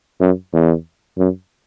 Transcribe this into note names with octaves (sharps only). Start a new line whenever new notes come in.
F#2
E2
F#2